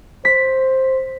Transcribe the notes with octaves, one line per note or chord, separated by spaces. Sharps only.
C5 B6